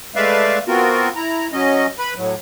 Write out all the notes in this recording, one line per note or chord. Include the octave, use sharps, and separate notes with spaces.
G#3 A3 B4 D5 E5 F5
B3 C4 F4 F#4 A#4
E4 A#5
F#3 C#4 D#5
B4 B5
A2 F#3